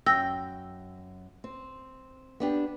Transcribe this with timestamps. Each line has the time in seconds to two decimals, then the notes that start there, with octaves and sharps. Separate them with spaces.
0.06 F#2 G5 E6 A#6
1.44 C4
2.40 B3 D4 G4